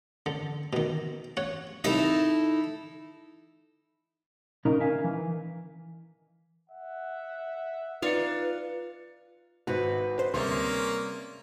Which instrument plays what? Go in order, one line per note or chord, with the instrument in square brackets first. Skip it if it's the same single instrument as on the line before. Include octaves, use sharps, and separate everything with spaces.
[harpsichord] D3
B2 D#3
C#5 F#5
[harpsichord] C2 D#5 [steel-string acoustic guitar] D#4 E4 A4
[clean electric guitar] A#2 C#3 D#4 A#4 D#5 A#5
A#4 E5 F5 G#5
E3
[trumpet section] E5 F#5
[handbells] D#4 D5 C#7 [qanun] F4 F5 [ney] B4
[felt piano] G#1 C5 [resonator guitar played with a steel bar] F#4 B4
[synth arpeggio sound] D3 C5
[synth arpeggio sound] D2 [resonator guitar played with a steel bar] C3 G3 G#3 [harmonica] A#3 C#4 [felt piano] C6